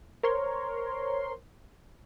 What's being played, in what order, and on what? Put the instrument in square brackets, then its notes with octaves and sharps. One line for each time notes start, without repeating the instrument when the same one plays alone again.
[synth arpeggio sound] A#4 C5 C#5 C6